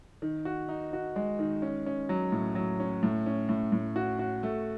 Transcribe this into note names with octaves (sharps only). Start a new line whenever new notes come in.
D#3
F#4
D#4
F#4
G#3
D#3
C#4
C#4
F#3
A2
F#3
C#4
A2
C#4
A2
A2
F#4
F#4
A3